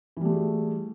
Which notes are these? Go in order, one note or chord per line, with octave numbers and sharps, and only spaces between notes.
E3 G3 A3 F#4 G#4